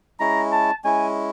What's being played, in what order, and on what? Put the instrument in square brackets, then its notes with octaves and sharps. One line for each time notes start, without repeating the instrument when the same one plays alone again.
[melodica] G#3 C#4 E4 [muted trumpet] A#5
[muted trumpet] A5
[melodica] G#3 C#4 E4 [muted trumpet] G#5